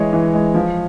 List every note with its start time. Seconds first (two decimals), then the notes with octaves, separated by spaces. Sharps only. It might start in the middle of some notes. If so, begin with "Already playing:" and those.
Already playing: E3 G#3 C#5 D#5
0.13 E3
0.33 G#3
0.54 F3